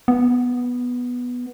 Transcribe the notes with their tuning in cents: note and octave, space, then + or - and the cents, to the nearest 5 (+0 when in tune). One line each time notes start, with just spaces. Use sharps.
B3 -5